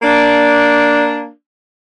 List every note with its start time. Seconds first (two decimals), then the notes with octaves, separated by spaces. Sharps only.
0.03 A#3 D4